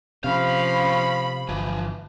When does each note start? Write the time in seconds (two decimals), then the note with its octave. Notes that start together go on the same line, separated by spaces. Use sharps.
0.24 C3 F3 C#4 F5 B5
1.49 G1 E3 F3